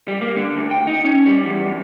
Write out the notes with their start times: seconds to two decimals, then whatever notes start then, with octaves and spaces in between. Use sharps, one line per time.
0.08 G3
0.21 A#3
0.36 D3
0.57 D2
0.71 G5
0.87 D#4
1.05 C#4
1.26 G3
1.46 E2
1.66 F#2